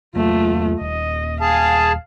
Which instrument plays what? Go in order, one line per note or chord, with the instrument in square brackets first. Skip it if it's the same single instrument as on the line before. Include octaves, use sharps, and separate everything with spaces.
[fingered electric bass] E2 F#3 A#3 [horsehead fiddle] A3 F4
[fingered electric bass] D#1 [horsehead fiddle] D#5
[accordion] G#4 A5 [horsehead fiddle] F5